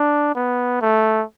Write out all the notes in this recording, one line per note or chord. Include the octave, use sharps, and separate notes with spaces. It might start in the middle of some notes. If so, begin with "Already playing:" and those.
Already playing: D4
B3
A3